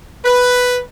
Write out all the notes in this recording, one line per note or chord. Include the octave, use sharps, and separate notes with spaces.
B4